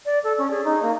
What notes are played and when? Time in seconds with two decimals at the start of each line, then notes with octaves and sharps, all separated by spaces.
0.05 D5
0.24 A4
0.38 C#4
0.50 G#4
0.65 D#4
0.82 A#3